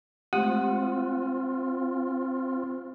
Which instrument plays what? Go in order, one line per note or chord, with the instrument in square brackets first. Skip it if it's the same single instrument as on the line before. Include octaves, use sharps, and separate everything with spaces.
[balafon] G#3 A3 G4 [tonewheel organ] C4 F4 [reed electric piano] F#5